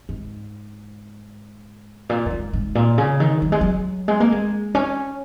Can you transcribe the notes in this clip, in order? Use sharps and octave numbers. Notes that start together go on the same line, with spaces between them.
G#2
A#2
F#2
G#2
G#2
A#2
C#3
D#3
F#3
G#3
F#3
G#3
A#3
G#3
C#4